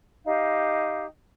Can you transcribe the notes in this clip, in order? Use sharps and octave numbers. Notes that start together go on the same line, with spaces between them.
D#4 G4 F5